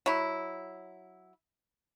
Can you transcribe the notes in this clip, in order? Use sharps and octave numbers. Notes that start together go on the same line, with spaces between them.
F#3 E4